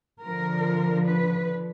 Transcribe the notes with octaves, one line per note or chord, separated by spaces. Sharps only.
D3 F3 A#4
B4